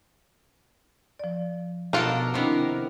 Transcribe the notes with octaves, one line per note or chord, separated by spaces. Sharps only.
F3 D5
B2 D4 D#4 F4 A4 A#4
C3 D#3 B3 C4 D4 E4 A#4